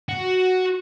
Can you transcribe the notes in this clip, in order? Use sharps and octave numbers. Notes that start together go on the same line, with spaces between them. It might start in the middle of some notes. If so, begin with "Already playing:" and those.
F#4